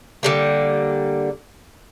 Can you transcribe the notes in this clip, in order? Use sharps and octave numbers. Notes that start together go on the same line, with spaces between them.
D3 G3 A#3